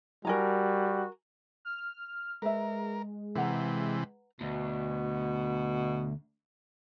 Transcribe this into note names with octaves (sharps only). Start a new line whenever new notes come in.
G3 F#4 A#4 G#5 A#5
F6
G#3 A#4 B4 E5
C3 E3 B4 F#5 A#5
D2 B2